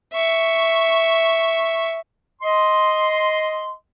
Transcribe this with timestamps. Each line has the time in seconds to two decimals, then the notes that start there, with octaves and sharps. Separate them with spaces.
0.13 E5 C#6
2.41 D#5 C6